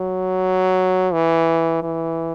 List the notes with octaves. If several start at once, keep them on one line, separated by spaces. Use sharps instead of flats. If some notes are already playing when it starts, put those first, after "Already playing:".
Already playing: F#3
E3
E3